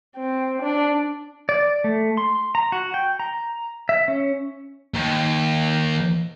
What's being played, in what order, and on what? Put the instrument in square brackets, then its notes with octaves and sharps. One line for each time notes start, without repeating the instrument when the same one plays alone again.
[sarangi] C4
D4
[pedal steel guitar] D5
A3
C6
A#5
F#4
G5
A#5
E5
C#4
[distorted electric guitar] D#2